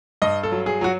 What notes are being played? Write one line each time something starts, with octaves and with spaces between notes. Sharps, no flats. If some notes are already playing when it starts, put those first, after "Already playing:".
G2 D#5
A4
F#3
G#4
F#3 F#4